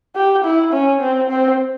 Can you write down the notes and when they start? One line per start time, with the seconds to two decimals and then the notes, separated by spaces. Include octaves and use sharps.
0.16 G4
0.44 E4
0.73 C#4
1.01 C4
1.29 C4